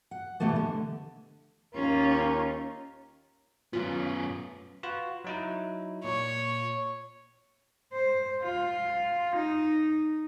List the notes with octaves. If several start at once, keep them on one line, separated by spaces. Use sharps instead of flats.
F#5
B2 E3 G3 A3 B3
D3
D#2 C#4 F4 A#4
F#2 A3 B3 C#4 F4
F4 F#4 B4
F#3 D#4 E4
A#2 C#5
C5
F4
D#4